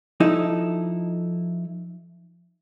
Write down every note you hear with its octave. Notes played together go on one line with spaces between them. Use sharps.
F3 D#4 E4 A4